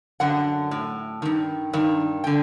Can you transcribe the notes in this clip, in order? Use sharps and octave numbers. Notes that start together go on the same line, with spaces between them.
F#2 D3 F#5
A2
G2 D#3
G2 D#3
D3 G5